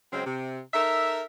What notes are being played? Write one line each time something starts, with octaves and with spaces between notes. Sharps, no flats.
C#3 F#3 G#3 C4
C3
D#4 A4 A#4 E5